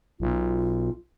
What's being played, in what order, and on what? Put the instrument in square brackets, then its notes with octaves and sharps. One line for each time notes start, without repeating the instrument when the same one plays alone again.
[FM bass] B1 [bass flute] F4